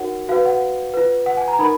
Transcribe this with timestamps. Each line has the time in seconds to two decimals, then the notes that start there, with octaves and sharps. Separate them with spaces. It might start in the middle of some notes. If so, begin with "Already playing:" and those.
Already playing: D#4 F#4 A#4 C#5 F#5
0.29 F#4 B4 F5
0.45 F#5
0.94 F4 B4
1.26 F#5
1.37 G#5
1.48 A#5
1.59 D#4 A#4 B5